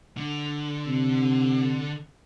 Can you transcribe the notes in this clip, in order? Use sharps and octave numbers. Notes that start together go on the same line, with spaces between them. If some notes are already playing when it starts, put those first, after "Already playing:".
D3
C3